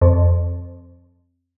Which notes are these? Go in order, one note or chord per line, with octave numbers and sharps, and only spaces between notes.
F2